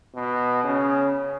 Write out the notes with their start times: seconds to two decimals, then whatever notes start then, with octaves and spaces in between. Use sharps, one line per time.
0.14 B2
0.64 C#3